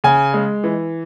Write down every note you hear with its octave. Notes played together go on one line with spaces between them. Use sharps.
C#3 G#5
G#3
E3